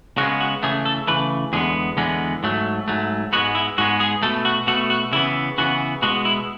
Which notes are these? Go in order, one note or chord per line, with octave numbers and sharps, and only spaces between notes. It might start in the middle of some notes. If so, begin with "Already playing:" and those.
C#3 G#3 B3 F#4
F#4
C#3 E3 A3 G#4
A4
C#3 E3 A3 B4
E2 D3 G#3 B3 G#4
E2 D3 G#3 B3
G#2 F#3 A3
G#2 F#3 A3
G#2 G#3 B3 F#4
E4
G#2 G#3 B3 F#4
G#4
B2 A3 A4
F#4
B2 A3 F#4
F#4
C#3 E3 B3 E4
C#3 E3 B3 F#4
B2 G#3 B3 F#4
E4